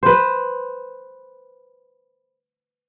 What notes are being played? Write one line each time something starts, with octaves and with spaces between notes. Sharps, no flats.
B4 C5